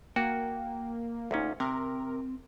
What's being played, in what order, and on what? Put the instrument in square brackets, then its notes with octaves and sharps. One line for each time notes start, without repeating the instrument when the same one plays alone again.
[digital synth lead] A#3 [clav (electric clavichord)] F#4 [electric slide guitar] G5
[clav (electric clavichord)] D2 A#2 C#4 [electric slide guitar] A3 D#4
[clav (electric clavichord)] C3 [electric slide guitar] C4 [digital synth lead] A#4